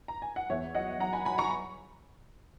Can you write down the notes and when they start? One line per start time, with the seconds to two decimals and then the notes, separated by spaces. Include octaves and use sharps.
0.08 A#5
0.22 G#5
0.36 F#5
0.50 E2 C#5 E5
0.75 F#3 D#5 F#5
1.00 F#3 F#5 A#5
1.13 G#5 B5
1.25 F#3 G#5 B5
1.38 A#5 C#6